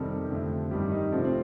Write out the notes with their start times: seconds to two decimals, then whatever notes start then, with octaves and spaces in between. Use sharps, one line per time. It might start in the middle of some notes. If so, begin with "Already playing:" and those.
Already playing: F2 C3 D#3 G3 A4
0.10 G4
0.30 F2 D3 A3
0.71 G2 D#3 G3 G4
0.91 D#4
1.11 C3 F3 A3 D4
1.24 C4